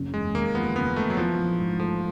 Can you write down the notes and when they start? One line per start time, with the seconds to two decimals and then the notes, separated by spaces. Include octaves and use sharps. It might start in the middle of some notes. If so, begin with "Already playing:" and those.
Already playing: F#1 C#3
0.14 E1 G#3
0.34 D#2 A#3
0.55 F3 B3
0.76 C#3 B3
0.96 E1 A3
1.10 F#3
1.17 E3 F3
1.38 A#1
1.59 G#2
1.79 F3 A3